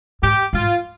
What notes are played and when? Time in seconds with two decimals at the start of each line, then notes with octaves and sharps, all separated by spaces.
0.22 G#2 G4
0.53 G#2 F4